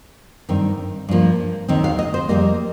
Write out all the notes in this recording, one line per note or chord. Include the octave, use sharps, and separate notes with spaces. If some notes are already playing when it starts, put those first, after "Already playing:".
G2 D#3 C4
G2 F3 A#3
D#2 D#3 C4
F5
D#5
C5
F2 C3 G3 A#3 D#5